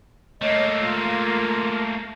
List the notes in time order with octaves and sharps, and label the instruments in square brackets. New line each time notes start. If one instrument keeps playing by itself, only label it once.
[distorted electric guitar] A3 A#3 [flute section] C#5 D#5
[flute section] F4 A#4